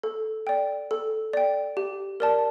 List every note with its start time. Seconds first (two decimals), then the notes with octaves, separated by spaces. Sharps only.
0.03 A4
0.47 D5 G5
0.91 A4
1.33 D5 G5
1.77 G4
2.20 A#4 D5 A5